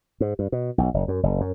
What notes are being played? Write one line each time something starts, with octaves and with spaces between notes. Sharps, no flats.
G#2
G2
B2
B1
F#1
F#2
F#1
F#2